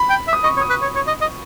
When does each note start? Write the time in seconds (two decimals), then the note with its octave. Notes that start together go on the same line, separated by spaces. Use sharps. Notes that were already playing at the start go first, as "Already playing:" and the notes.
Already playing: B5
0.10 G5
0.28 E5
0.33 D#6
0.44 D#5 C#6
0.57 C#5
0.61 D#6
0.70 B4
0.82 C#5
0.96 C#5
1.07 D#5
1.21 D#5